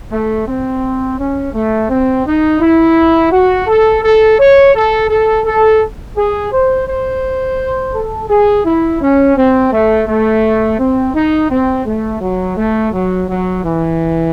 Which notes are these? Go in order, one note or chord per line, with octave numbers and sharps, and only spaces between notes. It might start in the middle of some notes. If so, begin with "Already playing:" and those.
A3
C4
C#4
A3
C4
D#4
E4
F#4
A4
A4
C#5
A4
A4
A4
G#4
C5
C5
A4
G#4
E4
C#4
C4
A3
A3
C4
D#4
C4
A3
F#3
A3
F#3
F#3
E3